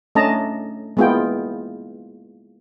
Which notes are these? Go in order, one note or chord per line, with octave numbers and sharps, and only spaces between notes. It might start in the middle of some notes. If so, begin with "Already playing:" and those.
A3 C#4 D4 D#5 A5 A#5
G#3 A#3 B3 E4 F4 G5